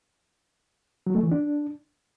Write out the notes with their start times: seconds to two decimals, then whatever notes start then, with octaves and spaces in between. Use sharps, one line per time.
1.06 F#3
1.15 A3
1.23 E3
1.31 D4